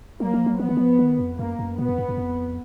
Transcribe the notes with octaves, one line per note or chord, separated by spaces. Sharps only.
F#3 A#3
F3
F#3
F3 B3
D#3
F3
D#3
F2
F#2 A#3
F#2
A#2 B3
F2
F#2
F#2
F2